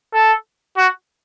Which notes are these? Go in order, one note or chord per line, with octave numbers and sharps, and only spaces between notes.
A4
F#4